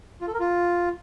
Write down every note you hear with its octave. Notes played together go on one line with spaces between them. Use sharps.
F4
A4
A#4
F4